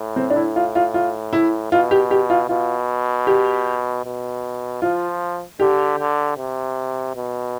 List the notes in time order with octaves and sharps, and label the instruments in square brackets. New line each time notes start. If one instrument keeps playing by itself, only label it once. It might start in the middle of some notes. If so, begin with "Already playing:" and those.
Already playing: [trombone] A2
[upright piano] C4
D4
E4
F4
F4
F4
E4
[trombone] B2 [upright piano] F4
[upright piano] G4
G4
F4
[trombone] B2 [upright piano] F4
[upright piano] G4
[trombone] B2
[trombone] F3 [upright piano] F4
[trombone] D3 [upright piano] G4
[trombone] D3
C3
B2